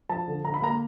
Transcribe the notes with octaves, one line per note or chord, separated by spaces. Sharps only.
F3 A5
D3
D3 A#5
B5
A#3 A#5